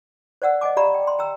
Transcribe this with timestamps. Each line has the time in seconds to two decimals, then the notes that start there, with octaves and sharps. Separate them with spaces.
0.42 C5 D5 F#5 E6
0.61 D#5 F#5 G#5 D6
0.77 G4 D5 F5 A#5 B5
0.94 G5
1.07 C6
1.19 G5 A#5 E6